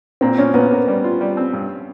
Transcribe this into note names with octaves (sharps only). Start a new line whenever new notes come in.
A#2 C4
A#2 C#4
A#2 B3
A#3
G3
F4
G3
C4
G2